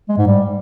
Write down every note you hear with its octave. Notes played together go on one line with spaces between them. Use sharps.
G#3
G#2
G3